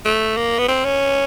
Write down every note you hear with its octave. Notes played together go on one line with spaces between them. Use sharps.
A3
A#3
B3
C4
C#4